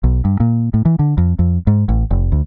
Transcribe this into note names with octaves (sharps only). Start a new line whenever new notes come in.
B1
G2
A#2
A2
E3
D3
F2
F2
G#2
A1
F1
D2